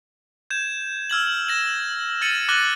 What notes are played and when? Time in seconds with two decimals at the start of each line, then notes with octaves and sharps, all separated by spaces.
0.50 G6 G#6 E7
1.10 E6 F6 G#6 F#7
1.49 A#6 E7
2.21 F6 A6 C#7 D#7 F#7
2.49 D6 F#6 A#6 D#7 F#7 G7